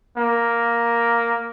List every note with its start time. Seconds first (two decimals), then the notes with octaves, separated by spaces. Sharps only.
0.17 A#3